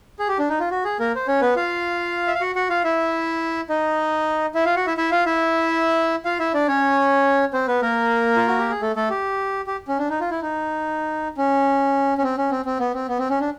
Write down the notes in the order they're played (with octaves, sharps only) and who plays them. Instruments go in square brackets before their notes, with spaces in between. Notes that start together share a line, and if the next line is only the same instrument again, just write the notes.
[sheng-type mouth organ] G#4
G4
D4
D#4
F4
F#4
G#4
A#3 A#4
C5
C#4 C#5
B3 B4
F4 F5
E5
F5
F#4 F#5
F#4 F#5
F4 F5
E4 E5
D#4 D#5
E4 E5
F4 F5
F#4 F#5
E4 E5
E4 E5
F4 F5
E4 E5
F4 F5
E4 E5
D4 D5
C#4 C#5
C4 C5
B3 B4
A#3 A#4
F4
F#4
G4
G#4
A3 A4
A3 A4
G4
G4
C#4
D4
D#4
F4
E4
D#4
C#4
C#4
C4
C#4
C4
C4
B3
C4
B3
C4
C#4
D4